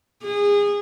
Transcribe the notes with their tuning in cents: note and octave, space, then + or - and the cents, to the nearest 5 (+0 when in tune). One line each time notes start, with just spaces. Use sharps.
G#4 -25